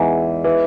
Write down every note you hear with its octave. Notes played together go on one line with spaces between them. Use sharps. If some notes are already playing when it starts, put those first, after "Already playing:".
Already playing: E2 E3 G#3 D#4
E3